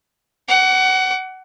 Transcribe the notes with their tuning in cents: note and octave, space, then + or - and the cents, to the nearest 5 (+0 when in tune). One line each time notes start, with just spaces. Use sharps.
F#5 +20 D6 -25